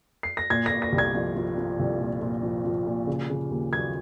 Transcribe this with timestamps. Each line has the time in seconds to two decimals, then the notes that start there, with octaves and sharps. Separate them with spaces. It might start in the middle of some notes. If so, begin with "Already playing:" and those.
0.23 C7
0.37 A#6
0.50 A#2 G#6
0.66 A#6
0.71 A#2
0.82 A#6
0.92 C2
0.98 G#6
1.15 F3
1.36 F3
1.58 F3
1.79 C2
2.00 A#2
2.22 A#2
2.43 F3
2.65 F3
2.87 A#2
3.07 C#3
3.30 C#3
3.50 D#2
3.73 F#3 G#6